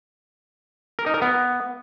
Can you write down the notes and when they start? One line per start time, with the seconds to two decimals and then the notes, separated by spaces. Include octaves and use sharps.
0.99 A#4
1.06 D#4
1.14 A#4
1.22 B3